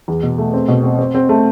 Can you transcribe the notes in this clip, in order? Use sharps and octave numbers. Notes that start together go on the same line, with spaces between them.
E2
B2
A3
C4
B2
C4
C4
C4
A3